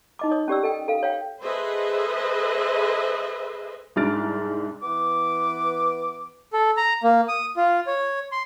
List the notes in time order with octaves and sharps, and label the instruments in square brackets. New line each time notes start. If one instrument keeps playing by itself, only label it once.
[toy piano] D#4 D#5 D6
C#5 D#6
C#4 G4 D5 E6
A4 D#5 G5
A4 F5
C#5 F5 G5
[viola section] G#4 A4 B4 C5 D#5 E5
[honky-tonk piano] C2 G#2 D4 F6 A6 D7
[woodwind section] E3 B3 B4 D6
[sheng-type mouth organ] A4
A#5
A#3
D#6
F4
C#5
C6